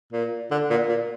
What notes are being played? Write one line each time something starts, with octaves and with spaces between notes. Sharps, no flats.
A#2
D3
A#2
A#2